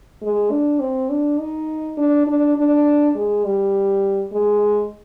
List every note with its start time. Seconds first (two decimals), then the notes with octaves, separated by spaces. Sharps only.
0.22 G#3
0.51 D4
0.80 C4
1.10 D4
1.39 D#4
1.98 D4
2.27 D4
2.57 D4
3.15 G#3
3.45 G3
4.32 G#3